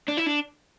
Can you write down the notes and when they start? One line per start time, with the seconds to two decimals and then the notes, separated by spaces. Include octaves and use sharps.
0.08 D4
0.17 E4
0.26 D4